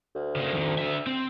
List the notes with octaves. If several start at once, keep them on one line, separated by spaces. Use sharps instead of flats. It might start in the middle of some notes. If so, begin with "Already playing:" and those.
D2
C#3 A#3
F2 D#3
D3 E5
C4